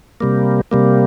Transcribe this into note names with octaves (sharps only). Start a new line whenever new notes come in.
C3 G3 A#3
C3 G3 A#3